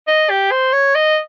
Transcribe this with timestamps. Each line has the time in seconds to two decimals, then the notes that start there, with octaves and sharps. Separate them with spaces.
0.08 D#5
0.30 G4
0.51 C5
0.73 C#5
0.95 D#5